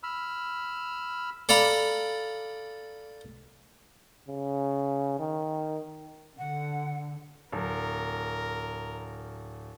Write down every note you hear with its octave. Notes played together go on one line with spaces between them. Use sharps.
B5 E6 F6
A4 D5 F5 A#5 B5
C#3
D#3
D3 F#5
D1 A#4